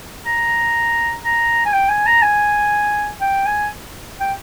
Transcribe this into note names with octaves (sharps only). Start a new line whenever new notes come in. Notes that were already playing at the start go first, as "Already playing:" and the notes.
A#5
A#5
G#5
G5
G#5
A#5
G#5
G5
G#5
G5